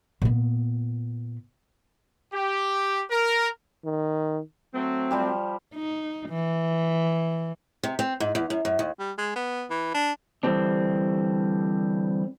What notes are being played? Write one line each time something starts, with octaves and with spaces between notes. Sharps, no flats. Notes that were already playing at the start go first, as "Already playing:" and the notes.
A#2 B3
G4
A#4
D#3
F#3 A3 C4
F3 G3 G4
D#4
E3
C3
C4
G#2
E2
F#2
F#2
D#2
G3
G#3
B3
E3
D4
D3 E3 G3 C4 D4